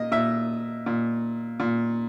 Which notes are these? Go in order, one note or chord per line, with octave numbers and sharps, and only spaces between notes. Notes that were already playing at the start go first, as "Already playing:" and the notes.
Already playing: A#2 D#5
A#2 E5
A#2
A#2